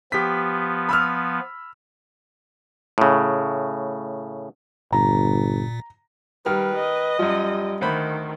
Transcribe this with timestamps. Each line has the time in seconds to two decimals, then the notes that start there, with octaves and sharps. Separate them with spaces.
0.12 F3 B3 G4 B6
0.89 B5 E6 F6
2.98 A2 C#3
4.93 G1 A#2 A#5
6.46 D#3 G3 B4 F6
6.75 D#5
7.19 F#2 F3 G3
7.81 D2 D#3 C5 B5